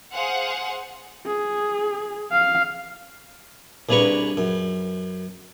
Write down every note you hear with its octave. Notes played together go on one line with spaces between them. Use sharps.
G#4 C5 F5 F#5
G#4
F5
C2 C#3 D4 B4 A#5 C#6
F#2